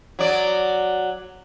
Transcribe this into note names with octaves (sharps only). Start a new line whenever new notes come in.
F#3 D5